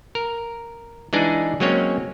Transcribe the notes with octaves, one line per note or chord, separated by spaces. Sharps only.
A#4
E3 G#3 D4 D#4 G#4
F#3 G#3 A#3 C4 C#4 C#5